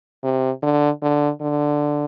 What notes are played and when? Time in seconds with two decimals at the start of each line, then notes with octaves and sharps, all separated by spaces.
0.24 C3
0.62 D3
1.02 D3
1.41 D3